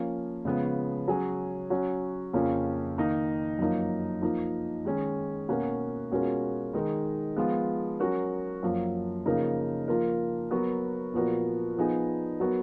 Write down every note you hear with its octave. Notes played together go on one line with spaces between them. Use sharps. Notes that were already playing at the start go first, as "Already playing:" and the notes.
Already playing: F3 A#3 C#4
C#3 F3 G#3 B3
F#3 C#4 G#4
F#3 C#4 F#4
F2 C#3 F3 A#3 C#4
D#3 A#3 D#4
F#2 F3 A#3 D#4
F3 A#3 D#4
D#3 G#3 C#4
B2 A#3 C#4 F#4 A#4
B2 G#3 C#4 F4 A#4
D#3 G#3 D#4 A#4
F3 G#3 B3 F4
F#3 C#4 F#4 A#4
F#2 F3 A#3
C#3 F3 A#3 D#4 A#4
F3 A#3 F4 A#4
F#3 B3 F#4 A#4
A#2 F3 B3 F#4 A#4
F3 B3 D#4 G#4
F#3 B3 F#4 A#4